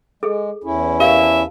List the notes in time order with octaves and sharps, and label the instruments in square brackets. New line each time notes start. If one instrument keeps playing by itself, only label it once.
[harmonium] G#3 [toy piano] G#4 A4
[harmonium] E2 C#4 E4
[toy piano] G4 A#4 F5 [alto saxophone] E5
[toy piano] A5